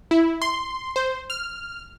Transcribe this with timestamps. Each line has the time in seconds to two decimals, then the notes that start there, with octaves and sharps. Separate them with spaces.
0.11 E4
0.42 C6
0.96 C5
1.30 F6